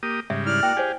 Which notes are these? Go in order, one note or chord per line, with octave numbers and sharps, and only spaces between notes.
A#3 G4 D#6
G#2 C#3 G3 E5
E4 D5 F6
A#3 F#4 G5
G4 G#4 C5 F5 G#5